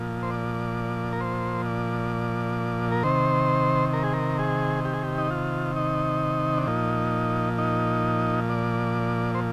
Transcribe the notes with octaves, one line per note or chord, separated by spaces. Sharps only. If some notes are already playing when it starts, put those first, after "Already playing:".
Already playing: A#2 F3
C5
D5
A#4
C5
D5
A#4
C3 D#3 C5
A#4
G#4
A#4
G#4
G4
G#4
G4
D#4
F4
D#4
D4
A#2 F3 D#4
D#4
D5
C5